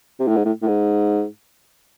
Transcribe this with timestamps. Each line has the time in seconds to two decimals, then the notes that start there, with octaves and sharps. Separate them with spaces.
0.20 C3
0.28 A2
0.37 G#2
0.45 A2
0.62 A2
0.68 G#2